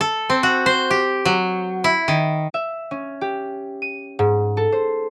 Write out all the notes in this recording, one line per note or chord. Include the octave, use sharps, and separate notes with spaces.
A4
C4
F#4
C5
G4
F#3
E4
D#3
E5
C#4
G4
D#7
G#2
A4
C5